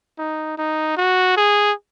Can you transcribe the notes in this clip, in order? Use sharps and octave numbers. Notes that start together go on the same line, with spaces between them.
D#4
D#4
F#4
G#4